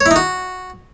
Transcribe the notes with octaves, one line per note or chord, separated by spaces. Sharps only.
C#5
E4
D#4
F#4